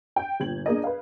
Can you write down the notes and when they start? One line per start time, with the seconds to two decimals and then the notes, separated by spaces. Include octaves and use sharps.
0.16 G5 G6
0.40 G1 A#2 G#6 F#7
0.66 A#3 D4 G#4 A#4 D5 D#5
0.84 B4 F5